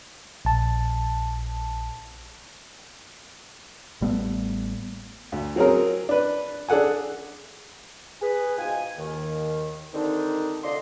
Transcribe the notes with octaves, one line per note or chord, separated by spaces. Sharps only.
A#1 A5
A1 G3 A3 B3
D2
F#3 C4 C#4 G#4 A#4
D4 B4
D4 G#4 A4 F#5 G#5
G#4 B4
G#2 B2 F4 G5 G#5
D#2 D#3
D3 D#3 G3 C4 D4 D#4
C2 D3 F4 D5 D#5 C6